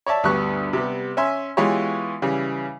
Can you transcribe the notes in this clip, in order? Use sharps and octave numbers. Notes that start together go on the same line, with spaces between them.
C#5 D5 E5 A5
D2 G2 G3 B3 C#6 F#6
C3 G3 B3
C#4 E5 G#5 C6
E3 G#3 B3 F4 G4 C#5
C#3 E3 G3